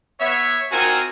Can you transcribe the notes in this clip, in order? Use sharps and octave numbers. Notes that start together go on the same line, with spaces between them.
B3 C#5 E5
C4 D#4 F4 F#4 A#4 G#5